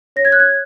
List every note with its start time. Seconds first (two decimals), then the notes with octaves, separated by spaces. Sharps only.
0.16 C#5 A#6
0.25 G#6
0.32 F#6
0.40 G#6